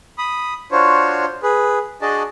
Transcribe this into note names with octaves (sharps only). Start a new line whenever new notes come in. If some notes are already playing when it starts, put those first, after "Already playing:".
B5 D#6
D4 F4 F#4 C5 C#5
G#4 B4
D4 F#4 G#4 D5 D#5 A5